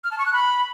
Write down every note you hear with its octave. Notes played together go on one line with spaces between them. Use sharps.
F6
A5
C#6
F#6
B5